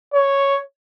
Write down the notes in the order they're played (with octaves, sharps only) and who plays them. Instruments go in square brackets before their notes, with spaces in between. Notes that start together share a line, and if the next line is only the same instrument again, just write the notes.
[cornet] C#5